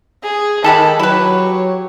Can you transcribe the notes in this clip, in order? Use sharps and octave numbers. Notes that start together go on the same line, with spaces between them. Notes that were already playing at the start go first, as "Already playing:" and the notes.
G#4
D#3 G#3 G4 A4 B5
F#3 E4 G4 B4 C#5